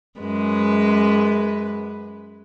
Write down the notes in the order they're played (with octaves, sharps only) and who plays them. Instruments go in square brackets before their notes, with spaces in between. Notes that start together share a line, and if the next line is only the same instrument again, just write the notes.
[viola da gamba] F#2 G#3 B4